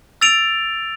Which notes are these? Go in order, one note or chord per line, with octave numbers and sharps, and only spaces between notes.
E6 A6 D7 F7